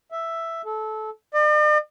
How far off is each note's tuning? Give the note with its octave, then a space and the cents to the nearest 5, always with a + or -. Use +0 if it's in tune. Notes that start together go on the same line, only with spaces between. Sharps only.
E5 +5
A4 -20
D5 +45